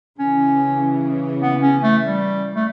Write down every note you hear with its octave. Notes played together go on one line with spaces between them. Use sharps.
C#3 E3 C#4
B3
C#4
A3
G3
A3